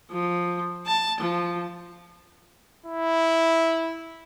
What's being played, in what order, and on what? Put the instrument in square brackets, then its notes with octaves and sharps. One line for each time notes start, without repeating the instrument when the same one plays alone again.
[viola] F3
A5
F3
[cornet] E4